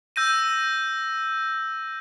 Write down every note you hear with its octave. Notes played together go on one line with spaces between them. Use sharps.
E6 G6 A#6 D#7